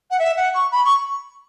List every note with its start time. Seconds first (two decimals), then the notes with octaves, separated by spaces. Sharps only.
0.10 F#5
0.19 E5
0.36 F#5
0.54 C#6
0.71 B5
0.84 C#6